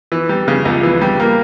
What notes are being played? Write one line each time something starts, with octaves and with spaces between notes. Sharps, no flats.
E3
G3
C#3
C#2
E3
G3
A#3